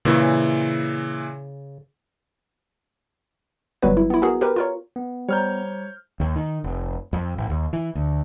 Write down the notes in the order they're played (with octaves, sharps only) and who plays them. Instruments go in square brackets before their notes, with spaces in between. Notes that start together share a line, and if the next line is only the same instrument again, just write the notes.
[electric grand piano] A#2 E3 E4 [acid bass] C#3
[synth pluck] G1 F#3 G3 B3 F#4 B4
E4
B3 E4
B3 F#4 G#4 A#4
G4 A#4 B4
F4 A#4 C#5
[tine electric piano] B3
[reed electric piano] G3 [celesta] C5 A#5 [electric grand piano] C#5 F6 G6
[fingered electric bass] D#2
D#3
F1
F2
A1
D#2
E3
D2